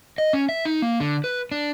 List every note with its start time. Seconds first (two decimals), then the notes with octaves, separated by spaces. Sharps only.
0.18 D#5
0.33 C#4
0.49 E5
0.65 D#4
0.82 A#3
1.00 D3
1.24 B4
1.51 D4